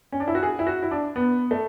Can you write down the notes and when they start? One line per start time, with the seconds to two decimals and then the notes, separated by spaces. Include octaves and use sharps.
0.12 C#4
0.20 D4
0.28 E4
0.35 F#4
0.43 G#4
0.59 E4
0.67 F#4
0.83 E4
0.91 D4
1.16 B3
1.51 A3